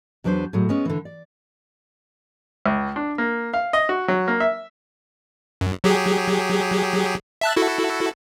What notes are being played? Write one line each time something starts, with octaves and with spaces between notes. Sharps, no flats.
E2 F#3 D4 B4 C5
A2 F#3 G#3
G#3 B3 C#4
D3 E3
D5
C#2
D4
A#3
F5
D#5
F#4
F#3
A#3
E5
F#2
F#3 G4 G#4
E5 A5 F#6
E4 F#4 A4